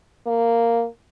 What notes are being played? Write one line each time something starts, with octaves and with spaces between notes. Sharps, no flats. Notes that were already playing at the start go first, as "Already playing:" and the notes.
A#3